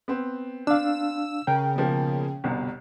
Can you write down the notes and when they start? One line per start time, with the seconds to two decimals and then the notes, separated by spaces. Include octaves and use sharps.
0.08 B3 C4
0.67 D4 F5 E6
1.47 C#3 A#4 G5
1.76 B2 F3 A#3
2.44 G1 C2 B2